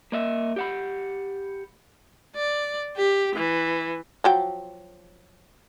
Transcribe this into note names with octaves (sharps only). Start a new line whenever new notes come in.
A#3 D#5 E5
G4 F#5 B5
D5
G4
E3
F3 F#3 G5